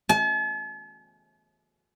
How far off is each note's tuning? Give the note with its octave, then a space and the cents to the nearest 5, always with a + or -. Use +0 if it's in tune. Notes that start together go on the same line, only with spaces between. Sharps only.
A5 -45